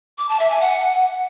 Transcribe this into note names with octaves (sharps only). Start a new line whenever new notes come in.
D6
A5
E5
G#5
F#5